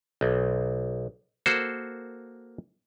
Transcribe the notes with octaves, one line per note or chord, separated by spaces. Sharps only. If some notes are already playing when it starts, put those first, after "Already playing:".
B1
A#3 F#4 A4 C5